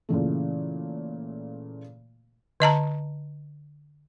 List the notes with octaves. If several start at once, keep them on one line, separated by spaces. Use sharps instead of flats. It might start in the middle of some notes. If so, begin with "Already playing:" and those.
A#2 C#3 E3 A3
D3 D#5 A5 A#5